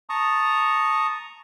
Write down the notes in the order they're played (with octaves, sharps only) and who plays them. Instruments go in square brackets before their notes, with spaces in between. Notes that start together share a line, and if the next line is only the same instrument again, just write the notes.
[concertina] A5 A#5 C#6 D#6